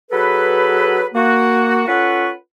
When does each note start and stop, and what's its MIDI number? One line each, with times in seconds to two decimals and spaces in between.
0.11 1.08 54
0.11 1.08 68
0.11 1.08 69
0.11 1.08 71
1.14 1.83 58
1.14 1.83 66
1.88 2.30 61
1.88 2.30 65
1.88 2.30 69
1.88 2.30 71
1.88 2.30 78
1.88 2.30 85